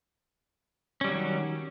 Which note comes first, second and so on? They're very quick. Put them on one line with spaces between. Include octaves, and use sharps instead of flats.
C#4 G3 F#3 D#3